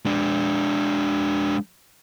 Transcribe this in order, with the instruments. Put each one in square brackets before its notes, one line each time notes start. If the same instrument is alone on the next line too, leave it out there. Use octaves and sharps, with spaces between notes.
[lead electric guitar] G#3 D4